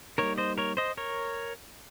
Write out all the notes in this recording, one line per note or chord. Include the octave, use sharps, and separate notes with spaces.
G3 A#3 D#4 A#4 C#5
C5 D#5
A#4 C#5
C5 D#5
A#4 C#5